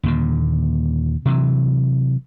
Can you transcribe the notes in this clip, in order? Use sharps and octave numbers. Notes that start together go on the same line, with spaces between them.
D#2 A#2 D3
C3 E3 F#3